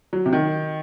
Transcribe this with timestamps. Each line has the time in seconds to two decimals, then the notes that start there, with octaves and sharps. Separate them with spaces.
0.13 F#3
0.26 C3
0.33 D#3